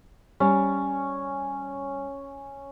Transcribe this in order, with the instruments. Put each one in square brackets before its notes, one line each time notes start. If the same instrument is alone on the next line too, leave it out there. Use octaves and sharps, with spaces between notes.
[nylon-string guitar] G3 [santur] C#4